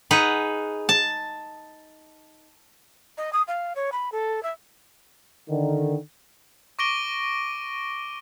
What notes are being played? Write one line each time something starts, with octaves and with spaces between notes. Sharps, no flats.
D#4 G#4 B4 F#5
A5
D#5
D#6
F5
C#5
B5
A4
E5
D3 D#3
C#6 D6 A#6 D7 D#7 G7